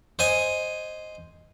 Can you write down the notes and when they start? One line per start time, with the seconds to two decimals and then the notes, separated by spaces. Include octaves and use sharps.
0.19 C5 D#5 G#5